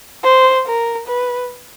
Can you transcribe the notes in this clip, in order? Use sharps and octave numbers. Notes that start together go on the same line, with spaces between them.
C5
A#4
B4